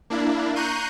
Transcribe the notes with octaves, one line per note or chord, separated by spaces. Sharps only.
A#3 D4 E4
A#5 C#6 F#6 G6 C7 D#7